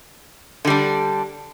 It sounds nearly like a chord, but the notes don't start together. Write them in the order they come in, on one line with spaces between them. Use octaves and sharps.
D3 G3 D4